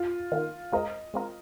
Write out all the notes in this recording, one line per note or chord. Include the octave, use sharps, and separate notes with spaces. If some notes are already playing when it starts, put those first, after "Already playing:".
Already playing: F4
D#3 A#3 F4
G#3 C4 F4 A#4 D#5
G#3 C4 F4 A#4